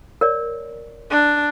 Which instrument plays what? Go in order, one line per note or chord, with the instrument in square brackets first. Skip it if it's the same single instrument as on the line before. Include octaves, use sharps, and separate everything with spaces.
[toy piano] A#4 C#5 D5
[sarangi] D4